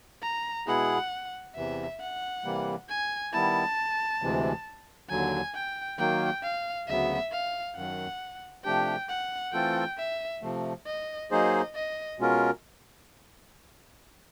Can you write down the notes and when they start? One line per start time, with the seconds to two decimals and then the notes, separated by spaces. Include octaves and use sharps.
0.22 A#5
0.67 B2 G#3 B3 E4 G#4 F#5
1.56 E2 C3 E3 E5
2.00 F#5
2.45 C3 E3 G3 A#3
2.89 G#5
3.33 D#3 G3 B3 E4 A5
4.22 D2 C3 E3 G#3
5.10 D#2 D3 F#3 G#5
5.54 G5
5.99 D#3 F#3 A#3 G5
6.43 F5
6.88 D2 C#3 F#3 B3 E5
7.32 F5
7.76 F#2 D#3 F#3 F#5
8.64 C3 F3 A3 D4 G4 G5
9.09 F#5
9.53 E3 A3 C4 F4 A4 G5
9.98 E5
10.42 C3 F3 A3
10.86 D#5
11.31 F#3 A#3 D#4 G#4 C5 D#5
11.75 D#5
12.19 B2 G#3 C#4 F4 A#4